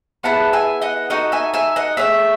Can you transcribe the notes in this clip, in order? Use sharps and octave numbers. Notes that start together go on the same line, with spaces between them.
B3 E4 G#4 F#5 A5
E5 G#5
D#5 F#5
D#4 F#4 A4 D#5 F#5
E5 G#5
E5 G#5
D#5 F#5
A3 C#4 G#4 C#5 E5